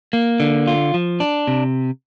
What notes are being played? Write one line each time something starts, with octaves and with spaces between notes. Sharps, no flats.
A#3
D3
F4
F3
D4
C3